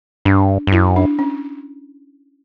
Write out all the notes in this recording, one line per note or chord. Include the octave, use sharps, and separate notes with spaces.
G2 D4
G2
F#2 E4
D4
C#4